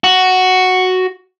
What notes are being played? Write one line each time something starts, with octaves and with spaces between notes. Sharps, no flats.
F#4